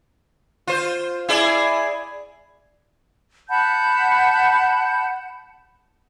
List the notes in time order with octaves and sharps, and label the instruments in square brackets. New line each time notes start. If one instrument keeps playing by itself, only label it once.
[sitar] F4 C5
E4 G#4 D5
[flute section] F#5 A5 B5 G6